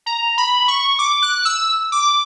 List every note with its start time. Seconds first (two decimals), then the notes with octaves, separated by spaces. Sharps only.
0.06 A#5
0.38 B5
0.68 C#6
0.99 D6
1.22 F#6
1.45 E6
1.92 D6